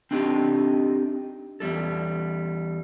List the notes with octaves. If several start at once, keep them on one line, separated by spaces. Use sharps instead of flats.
C4 D4 D#4 G4 A4
E2 G3 A4